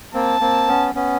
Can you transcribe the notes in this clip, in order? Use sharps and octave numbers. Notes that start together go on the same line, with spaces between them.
A#3 C4 A5
A#3 C4
B3 C#4
B3 C#4